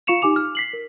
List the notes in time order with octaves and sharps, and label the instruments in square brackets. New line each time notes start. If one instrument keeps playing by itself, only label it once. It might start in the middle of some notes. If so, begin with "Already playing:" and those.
[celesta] F4 F5 C#6 C#7 E7 F7
D#4 G4 G#5 D6 F7
F6
B6 C7 F#7
A#4